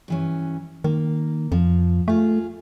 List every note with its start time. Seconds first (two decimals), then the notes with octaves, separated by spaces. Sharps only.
0.08 G2 E3 C#4
0.84 D#3 A#3
1.52 F2 F3
2.08 A3 F4 G#4